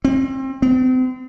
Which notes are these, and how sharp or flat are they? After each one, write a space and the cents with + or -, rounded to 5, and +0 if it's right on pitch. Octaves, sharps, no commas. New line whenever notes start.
C4 +30
C4 -40